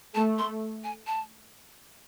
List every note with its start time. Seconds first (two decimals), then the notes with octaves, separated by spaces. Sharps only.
0.15 A3 A5
0.38 C6
0.84 G#5
1.07 A5